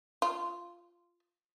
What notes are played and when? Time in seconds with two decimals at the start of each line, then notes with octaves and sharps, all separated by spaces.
0.22 F4